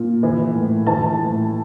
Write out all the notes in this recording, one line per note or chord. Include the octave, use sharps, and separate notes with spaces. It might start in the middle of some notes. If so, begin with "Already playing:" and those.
Already playing: A#2
E3
A2
E3 A5
A2